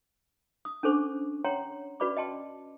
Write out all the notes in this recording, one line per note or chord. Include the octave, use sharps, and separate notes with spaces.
D#6
C#4 D4 A4 C5 C#6 D6
C#5 F#5 G5 A#5 C6
C#4 F#4 B4 D5 B5 D6
D#5 G5 A5 C6